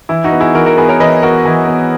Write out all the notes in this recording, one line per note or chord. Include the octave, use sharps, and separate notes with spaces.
E3 E4
D#4 F#4
B3
E4 G#4
E3 F#4 A#4
F#4 A#4
B3 G#4 B4
A#4 C#5
E3 B4 D#5
B3 F#4 A#4
E3
B3